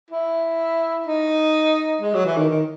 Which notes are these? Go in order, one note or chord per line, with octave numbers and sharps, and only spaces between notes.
E4
D#4
G#3
F#3
E3
D#3
D#3